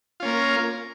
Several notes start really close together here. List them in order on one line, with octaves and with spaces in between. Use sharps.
F4 C#4 A#3 A#4